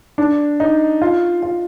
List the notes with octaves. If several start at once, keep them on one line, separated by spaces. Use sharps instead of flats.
D4
D#4
F4
F4